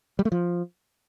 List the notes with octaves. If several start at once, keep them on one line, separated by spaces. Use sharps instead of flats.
G3
A3
F3